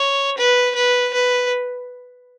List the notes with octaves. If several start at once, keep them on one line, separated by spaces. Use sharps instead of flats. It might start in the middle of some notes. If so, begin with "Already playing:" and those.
Already playing: C#5
B4
B4
B4